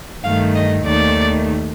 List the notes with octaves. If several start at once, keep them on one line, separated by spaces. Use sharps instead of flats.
G2 D#3 A3 F5
D#5
D#2 D#3 A3 D5